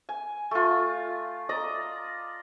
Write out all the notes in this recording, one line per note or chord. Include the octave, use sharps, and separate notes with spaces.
G#5
A3 F4
D5 D#5 A#5